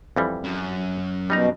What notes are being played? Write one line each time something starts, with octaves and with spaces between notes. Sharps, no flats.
F2 E3 G3
F#2
B2 G3 D#4 A#5